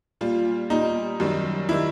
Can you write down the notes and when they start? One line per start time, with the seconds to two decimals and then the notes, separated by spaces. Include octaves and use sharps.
0.21 A#2 G3 F4
0.70 A#2 G3 D#4
1.20 F#2 D#3 G3
1.69 D#3 G3 E4